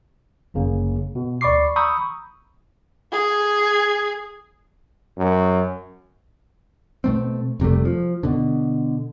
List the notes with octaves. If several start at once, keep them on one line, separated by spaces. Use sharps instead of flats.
G1 F#2 C#3 A#3
B2
D2 D5 B5 C#6 D6 C7
A#5 B5 C#6 D#6 E6 G6
G#4
F#2
B2 A3 C4
F1 C3 G3 A3
F3
B2 D3